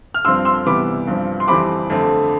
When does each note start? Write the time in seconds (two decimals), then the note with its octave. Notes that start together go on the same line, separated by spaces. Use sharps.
0.14 F6
0.25 G2 F3 C4 C6 E6
0.45 C6 E6
0.66 C3 E3 G3 B3 B5 D6
1.07 G2 F3 C4
1.40 C6
1.48 F2 E3 G3 C4 B5 D6
1.90 F2 D3 A3 C4